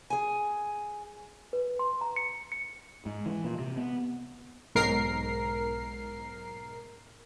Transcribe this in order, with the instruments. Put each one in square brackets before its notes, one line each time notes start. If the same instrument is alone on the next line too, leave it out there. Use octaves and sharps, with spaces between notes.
[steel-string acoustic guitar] G#4 G#5
[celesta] B4
C6
A#5
C#7
C#7
[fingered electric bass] G#2
E3
A#2
C3
B3
[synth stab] B1 G#2 A#4 C7